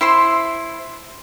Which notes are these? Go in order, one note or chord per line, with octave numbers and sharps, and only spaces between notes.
E4 C5 C6